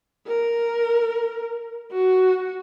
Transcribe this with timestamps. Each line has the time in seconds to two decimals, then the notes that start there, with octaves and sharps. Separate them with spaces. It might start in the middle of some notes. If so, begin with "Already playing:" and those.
0.26 A#4
1.91 F#4